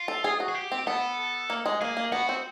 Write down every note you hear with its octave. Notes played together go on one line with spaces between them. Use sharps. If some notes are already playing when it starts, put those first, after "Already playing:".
Already playing: F4
A4
G#4
F#4
G#4
G4
C4
B3 A4
A#3
G#3
A#3 G#4
A#3
B3 F#4
C4